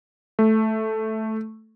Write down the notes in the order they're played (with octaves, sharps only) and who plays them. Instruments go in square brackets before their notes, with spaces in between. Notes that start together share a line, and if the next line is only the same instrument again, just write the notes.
[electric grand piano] A3